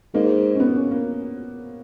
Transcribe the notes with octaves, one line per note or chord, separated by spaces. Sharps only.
G#2 A#3
C#4
B3
C#4
A#3